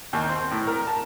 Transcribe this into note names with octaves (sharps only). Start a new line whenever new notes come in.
D#2
C4
A2
A#4
A5